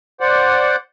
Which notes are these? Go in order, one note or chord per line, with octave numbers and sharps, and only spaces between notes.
C5 D5 F#5